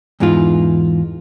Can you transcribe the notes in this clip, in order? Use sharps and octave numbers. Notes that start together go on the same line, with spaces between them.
E2 G#2 E3 G#3 D#4 F4